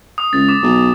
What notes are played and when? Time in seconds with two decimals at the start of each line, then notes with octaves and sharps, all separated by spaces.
0.18 D#6
0.33 C#2 A6
0.49 D6
0.63 B1